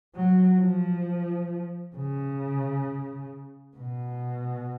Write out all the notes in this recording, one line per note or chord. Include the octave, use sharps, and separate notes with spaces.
F#3
F3
C#3
B2